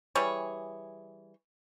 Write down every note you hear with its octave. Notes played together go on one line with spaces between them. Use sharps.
E3 G3 G#4 C#5